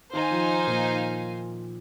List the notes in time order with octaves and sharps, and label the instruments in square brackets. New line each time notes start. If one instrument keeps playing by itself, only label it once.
[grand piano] D#3 [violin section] D#4 C5 F5 G#5
[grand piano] F3
A#2